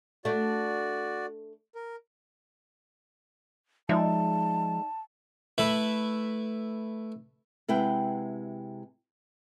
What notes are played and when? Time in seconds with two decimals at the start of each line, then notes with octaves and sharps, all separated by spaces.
0.25 A3 D4 F#4 D5
1.75 A#4
3.89 F3 G#3 D#4 D5 E5 A5
5.58 A3 E4 B4 E5
7.68 C3 G#3 E4 B4 F#5 G5